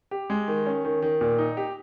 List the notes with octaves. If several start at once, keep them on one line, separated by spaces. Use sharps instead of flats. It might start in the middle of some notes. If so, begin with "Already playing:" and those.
G4
G#3
D#3
C#4
D#3
D#3
A#2
D#4
G4